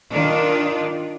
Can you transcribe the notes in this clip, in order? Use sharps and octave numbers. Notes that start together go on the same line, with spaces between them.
D#3 D4 F4